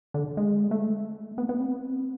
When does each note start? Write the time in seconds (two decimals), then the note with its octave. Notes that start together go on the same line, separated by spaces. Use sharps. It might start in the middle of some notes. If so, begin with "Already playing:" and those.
0.14 D3
0.37 G#3
0.71 A3
1.38 B3
1.49 B3
1.60 C4